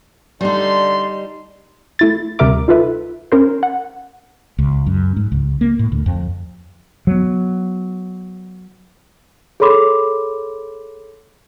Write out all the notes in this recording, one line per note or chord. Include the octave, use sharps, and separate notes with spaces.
D3 G3 D#4 D5 C6
A3 E4 A6
D2 C3 G3 A#4 E5 D6
D#4 F4 A4 B4 E5
C#4 A#4 C5
F#5
C#2
F#2
G#2
C#2
A#3
A2
D2
F2
F#3 B3
G#4 A4 C#5 B5 C6 D6